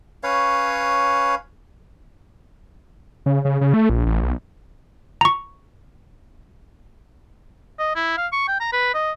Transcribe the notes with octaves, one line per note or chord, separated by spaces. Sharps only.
C#4 B4 C#5 F5
C#3
C#3
C#3
A3
A#1
A1
B1
A#5 C#6
D#5
E4
F5
C#6
G5
A#5
B4
D#5